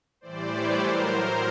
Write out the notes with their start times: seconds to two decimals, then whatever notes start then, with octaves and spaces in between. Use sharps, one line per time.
0.21 A2 E3 G3 C5 D5
0.50 B4 C#5
0.78 A2 F#3 A#4 C5